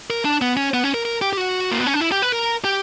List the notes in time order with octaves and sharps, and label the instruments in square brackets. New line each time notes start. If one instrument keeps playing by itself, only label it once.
[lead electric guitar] A#4
D4
B3
C#4
B3
C#4
A#4
A#4
G4
G4
F#4
A#3
B3
C#4
D4
E4
G4
B4
A#4
G4